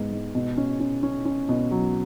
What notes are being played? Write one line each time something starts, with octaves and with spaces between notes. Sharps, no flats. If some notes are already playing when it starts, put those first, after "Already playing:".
Already playing: G#2 G#3 B3
G#2
B2
C#4
C#4
C#4
C#4
B2
F#3